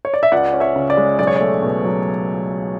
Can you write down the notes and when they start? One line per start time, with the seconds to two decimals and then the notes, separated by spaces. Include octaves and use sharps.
0.05 C#5
0.14 D5
0.23 E5
0.32 C#2 D5 F#5
0.53 C#4
0.60 C#5 E5
0.76 C#3
0.90 D5
0.97 G#3
1.19 B1 D5
1.27 C#5
1.36 A3 D5
1.62 B2
1.84 F#3